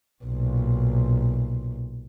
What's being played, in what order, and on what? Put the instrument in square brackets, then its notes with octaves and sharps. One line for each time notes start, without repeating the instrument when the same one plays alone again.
[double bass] B1 A#2